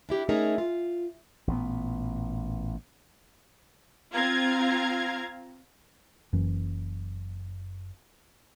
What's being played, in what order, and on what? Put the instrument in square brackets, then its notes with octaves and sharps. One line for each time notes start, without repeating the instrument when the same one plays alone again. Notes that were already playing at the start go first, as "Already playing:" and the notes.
[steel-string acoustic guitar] D4 E4 G4
A3 C#4 D#4 G#4 A#4 E5
F4
[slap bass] A1 A#2 C#3 B3
[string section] C4 F4 F5 A#5 G#6
[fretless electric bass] F#1 F#2 E3